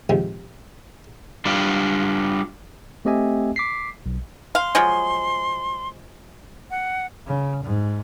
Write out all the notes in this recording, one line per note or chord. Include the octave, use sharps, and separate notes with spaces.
A2 C3 D#3 F3 G#3
G3 D4 F4
A3 C4 G4 D#5 E5 G#5
D6 B6 C7
B1
F5 C6
F3 F#3 G#3
F#5
C#3
G#2